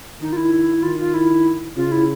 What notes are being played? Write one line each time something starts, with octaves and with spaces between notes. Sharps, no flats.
D#3 D#4
F4
E4
D#3 F4
F4
E4
C#3 F4
E4